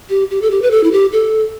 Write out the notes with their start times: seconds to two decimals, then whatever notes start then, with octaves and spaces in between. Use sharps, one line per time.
0.10 G4
0.30 G4
0.42 A4
0.51 G4
0.62 B4
0.71 A4
0.83 E4
0.92 G4
1.12 A4